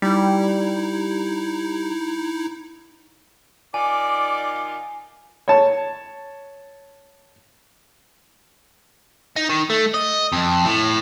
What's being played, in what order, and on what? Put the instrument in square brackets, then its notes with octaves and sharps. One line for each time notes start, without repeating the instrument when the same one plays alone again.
[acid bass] G3 [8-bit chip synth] D#4 E4
[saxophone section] D#3 D#4 F4 [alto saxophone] D5 [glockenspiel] G#5 [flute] D6
[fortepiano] C#5 A5
[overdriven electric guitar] D#4
D#3
A3
D#5
F2
A2